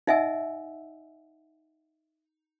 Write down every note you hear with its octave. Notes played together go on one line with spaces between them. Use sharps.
D#4 D#5 E5 F#5 G#5 E6